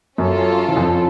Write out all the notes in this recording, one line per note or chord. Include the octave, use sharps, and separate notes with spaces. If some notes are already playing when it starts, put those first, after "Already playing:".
F#2 F#3 C#4 F4 A4
E3
F2 F3